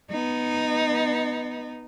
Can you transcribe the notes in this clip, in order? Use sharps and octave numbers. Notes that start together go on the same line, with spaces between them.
B3 D#4